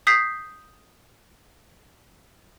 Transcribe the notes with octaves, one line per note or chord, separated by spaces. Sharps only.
D#6 G6 B6 C7